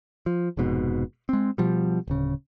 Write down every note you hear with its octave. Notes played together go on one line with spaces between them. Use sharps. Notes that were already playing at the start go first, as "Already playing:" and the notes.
F3
F1 F2 G#2 B2
G#3 C4
B2 F3 G3
D1 C#3